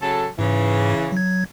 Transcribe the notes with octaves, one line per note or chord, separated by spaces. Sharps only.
C#3 F#3 A4
G#2 C#3 E3
F#3 G#6